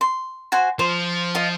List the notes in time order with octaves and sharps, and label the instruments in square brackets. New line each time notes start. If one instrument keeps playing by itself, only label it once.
[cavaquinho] C6
F#4 C5 G#5
[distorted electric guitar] F3 [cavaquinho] C5
[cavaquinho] F4 D#5